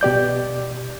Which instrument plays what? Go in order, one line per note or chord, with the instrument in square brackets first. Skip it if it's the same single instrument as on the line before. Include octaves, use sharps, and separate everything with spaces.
[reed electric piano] B2 G4 D5 G6